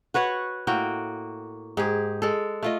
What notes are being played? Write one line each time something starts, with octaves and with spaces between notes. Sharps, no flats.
F#4 B4 C#5 F#5
A2 A#3 F#4 G5
G#2 G4 G#4
G#3 A4
A3 F4 D#5